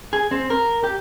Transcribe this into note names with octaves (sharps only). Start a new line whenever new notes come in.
G#4
C4
A#4
G4